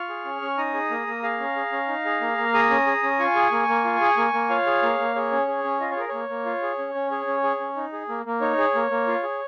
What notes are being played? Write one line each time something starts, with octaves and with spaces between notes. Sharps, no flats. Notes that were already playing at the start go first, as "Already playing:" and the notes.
Already playing: F4 C#6 F6
G#4
C#4
C#4
D#4 A#5 D#6
G#4
A#3
A#3
G#4 F5 A#5
C#4
G#4
C#4
D#4
G#4
A#3
A#3
G#4 A#5 D#6
C#4
G#4
C#4
F4 G#5 C#6
G#4
A#3
A#3
F4
G#4
A#3
A#3
F4 C#5 F5
G#4
A#3
A#3
G#4 C#5
C#4
G#4
C#4
F4 D#5
C#5
G#4 A#4
A#3 C#5
A#3
F4
G#4
C#4
C#4
G#4 C#5
C#4
G#4
C#4
D#4
G#4
A#3
A#3
D#4 C#5
G#4
A#3
A#3
F4
G#4